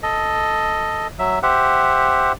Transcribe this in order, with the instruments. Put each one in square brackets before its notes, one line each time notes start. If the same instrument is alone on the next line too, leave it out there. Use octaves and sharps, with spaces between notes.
[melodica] A4 D#5
F#3 E5
G4 C5 E5 F#5